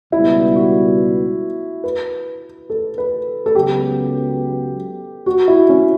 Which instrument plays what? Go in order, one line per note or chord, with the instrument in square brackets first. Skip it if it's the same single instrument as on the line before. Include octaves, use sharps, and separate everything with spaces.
[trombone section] C#2 B2 G3 B3 [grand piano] E4
[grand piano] F#4
B4
A4
B4
A4
[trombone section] C#2 C#3 F#3 B3 [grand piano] G4
[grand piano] F#4
E4
C#4